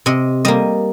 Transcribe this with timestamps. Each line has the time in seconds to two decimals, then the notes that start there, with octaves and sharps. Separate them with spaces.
0.06 C3 D#5
0.45 G3 A#3 D#5